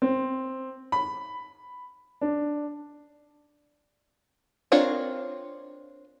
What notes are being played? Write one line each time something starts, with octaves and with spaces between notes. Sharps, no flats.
C4
B5
D4
C4 D4 F4 A#4 C#5